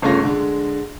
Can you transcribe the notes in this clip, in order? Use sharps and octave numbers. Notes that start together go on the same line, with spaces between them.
G1 C#3 A3 C#4 F4 A#6
D3 G#3